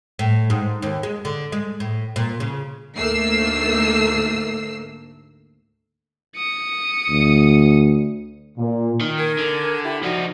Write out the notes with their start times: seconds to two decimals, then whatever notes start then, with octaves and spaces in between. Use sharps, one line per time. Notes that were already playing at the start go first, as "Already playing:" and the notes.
0.19 A2
0.50 G#2
0.82 D#2
1.03 G#3
1.25 D3
1.52 G#3
1.80 A2
2.16 A#2
2.40 C#3
2.97 D2 G#2 A3 A#3 E6 C7
6.37 D#6 C#7
7.10 D2
8.58 A#2
9.01 D#3
9.17 A#4 G#5 G#6
9.38 D3
9.84 E4 G4 B5
10.03 F3 D#4 F#4 D5